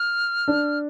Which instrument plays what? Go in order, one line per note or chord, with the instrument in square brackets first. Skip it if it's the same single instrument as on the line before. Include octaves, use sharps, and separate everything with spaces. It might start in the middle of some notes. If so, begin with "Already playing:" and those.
Already playing: [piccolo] F6
[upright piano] D4